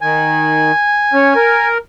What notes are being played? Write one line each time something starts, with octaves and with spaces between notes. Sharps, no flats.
D#3 G#5
C#4
A#4